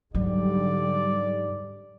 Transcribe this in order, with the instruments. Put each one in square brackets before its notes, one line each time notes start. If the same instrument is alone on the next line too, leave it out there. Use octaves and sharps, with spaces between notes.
[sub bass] G#2 [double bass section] D3 G3 [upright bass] F#3 [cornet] D5